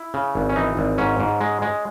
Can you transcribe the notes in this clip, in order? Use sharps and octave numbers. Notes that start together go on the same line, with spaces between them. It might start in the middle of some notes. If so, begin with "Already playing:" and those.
Already playing: E4
C#3
G#1
C#4
E3 D#4
G#1
G#2 C#4
G#2
G#3
G#3